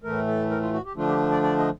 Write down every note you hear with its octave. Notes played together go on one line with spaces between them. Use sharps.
A2 E3 A3 A#4
A4
A#4
F4
F#4
G4
D3 F3 A3 D4 F4
G4
D5
D5
D#5